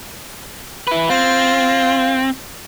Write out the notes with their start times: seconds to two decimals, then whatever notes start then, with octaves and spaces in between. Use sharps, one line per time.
0.87 E4 B4
1.10 C4 F4